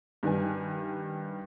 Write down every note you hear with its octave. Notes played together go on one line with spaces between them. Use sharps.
G2 D#3 D4 B4 G#5